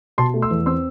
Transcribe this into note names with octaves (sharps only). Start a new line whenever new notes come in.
B2 A5 C6
A3
C6 E6
E2
C4 C6 E6